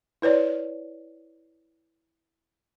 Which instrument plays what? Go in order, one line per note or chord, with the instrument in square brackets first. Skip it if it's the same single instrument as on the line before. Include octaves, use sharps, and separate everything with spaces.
[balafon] E4 B4 C#5 D5